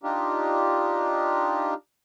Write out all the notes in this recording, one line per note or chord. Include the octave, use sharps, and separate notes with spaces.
D4 D#4 F4 G4